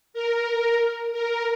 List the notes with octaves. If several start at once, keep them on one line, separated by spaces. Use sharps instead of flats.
A#4
A#4